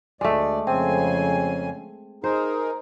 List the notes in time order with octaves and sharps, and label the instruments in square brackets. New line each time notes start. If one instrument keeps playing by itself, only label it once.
[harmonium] D2 D5 [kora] G#3 A3
[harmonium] F2 C#3 G#5 [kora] C4
[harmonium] D#4 G#4 A#4 [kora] C5